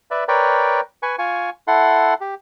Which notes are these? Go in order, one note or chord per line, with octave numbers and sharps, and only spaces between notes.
B4 D5 E5
A#4 B4 C#5 D5 G5
B4 G#5 C#6
F4 G#5 C#6
E4 A4 F#5 C6
G4